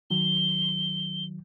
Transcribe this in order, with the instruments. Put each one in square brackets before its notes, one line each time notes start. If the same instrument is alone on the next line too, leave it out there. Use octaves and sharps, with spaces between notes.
[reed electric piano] D#3 F#3 [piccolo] G7